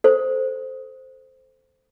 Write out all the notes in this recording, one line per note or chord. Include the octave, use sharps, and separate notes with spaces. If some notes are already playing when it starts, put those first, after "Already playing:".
A4 C5